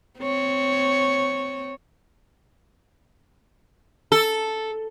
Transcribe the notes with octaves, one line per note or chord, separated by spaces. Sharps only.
C4 C#5
A4